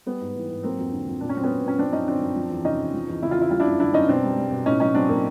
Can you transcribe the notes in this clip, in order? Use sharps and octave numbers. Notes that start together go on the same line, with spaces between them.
G3 B3
G#2
E3
G#2
F#3 A#3 C4
F2
D3
F2
A#2 D4
C#4
F#3 C4
B3 C#4
F#3
A#2 C#4
F3 C4 D4
F#2 C#4 D#4
D3 C4 D4
F#2
F3
E2
C3 C#4 D#4
E2
F3
E2
C#3 E4
F4
E2 E4
G3 F4
D4 E4
F#2
D3 D4 E4
F#2 C#4 D#4
B2 C4 D4
G3
G3
B2
A2 C#4 D#4
F#3 C#4 D#4
F#3 C4 D4
A2 A#3 C4